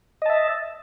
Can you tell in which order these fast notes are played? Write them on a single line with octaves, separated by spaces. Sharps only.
D#5 A5 E5